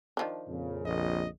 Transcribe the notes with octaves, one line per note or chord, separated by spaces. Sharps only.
D#3 F3 D4
F2 A#2 C#3
A#1 D#5